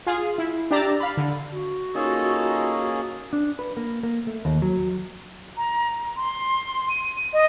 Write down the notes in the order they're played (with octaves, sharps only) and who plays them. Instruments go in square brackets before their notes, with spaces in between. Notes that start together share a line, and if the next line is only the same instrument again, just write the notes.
[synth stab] F4 G#4 F5
E4
D4 G4 D5 A#5 E6 A6
F5 B5
D3
[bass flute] F#4
[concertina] A#3 C#4 G#4 [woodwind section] D#4 F4 A4
[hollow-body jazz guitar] D4
B4
A#3
A#3
A3
D#2
F#3
[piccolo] A#5
C6
D#7
D#5